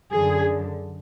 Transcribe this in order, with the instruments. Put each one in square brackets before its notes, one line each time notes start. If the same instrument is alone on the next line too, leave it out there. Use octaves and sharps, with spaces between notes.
[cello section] F#2 D3 G#4